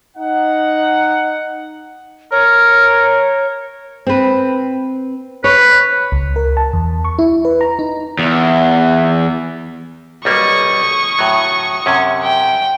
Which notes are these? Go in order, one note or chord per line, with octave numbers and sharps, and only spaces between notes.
D#4 F#5
A#4 C#5
C4 B4
B4 C#5
C#2
A#4
A5
E2
C#6
E4
B4
A#5
D#4
E2
B1 G3 A#3 C#6 D#6
A2 F#3
F#2 C3 C#4
G5